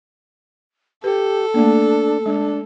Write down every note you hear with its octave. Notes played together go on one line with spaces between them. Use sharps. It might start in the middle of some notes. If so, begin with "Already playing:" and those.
G4 A4 B4
A3 A#3 D4
G#3 D4